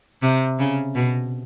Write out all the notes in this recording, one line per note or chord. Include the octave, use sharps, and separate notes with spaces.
C3
C#3
B2